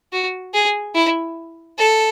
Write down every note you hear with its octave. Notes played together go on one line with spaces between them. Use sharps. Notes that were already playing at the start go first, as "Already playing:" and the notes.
F#4
G#4
E4
A4